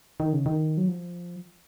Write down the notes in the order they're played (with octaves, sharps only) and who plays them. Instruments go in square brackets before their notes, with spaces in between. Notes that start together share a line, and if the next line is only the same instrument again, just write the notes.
[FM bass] D#3
C#3
D#3
F#3
F3